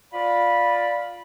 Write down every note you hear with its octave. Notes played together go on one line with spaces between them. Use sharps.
F4 D5 B5